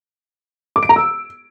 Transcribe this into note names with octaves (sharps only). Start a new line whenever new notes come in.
D6
D7
A#5
E6